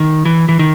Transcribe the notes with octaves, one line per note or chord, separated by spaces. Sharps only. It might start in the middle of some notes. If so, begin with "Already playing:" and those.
Already playing: D#3
E3
E3
D#3